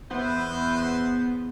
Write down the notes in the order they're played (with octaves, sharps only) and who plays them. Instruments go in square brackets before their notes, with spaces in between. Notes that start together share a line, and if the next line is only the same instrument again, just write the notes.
[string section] E2 [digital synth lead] B3 [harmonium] E4 [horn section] B4 C5